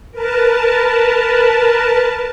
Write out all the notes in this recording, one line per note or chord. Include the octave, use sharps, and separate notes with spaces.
A#4 B4 A5